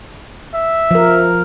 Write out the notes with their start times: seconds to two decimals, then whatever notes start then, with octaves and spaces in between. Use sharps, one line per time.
0.54 E5
0.91 F3 A#4